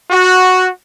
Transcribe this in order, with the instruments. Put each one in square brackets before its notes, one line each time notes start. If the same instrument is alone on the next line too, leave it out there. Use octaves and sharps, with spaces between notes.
[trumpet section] F#4